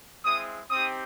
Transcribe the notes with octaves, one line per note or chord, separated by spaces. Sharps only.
G#3 C4 E4 D#6
C4 D#4 G4 D#6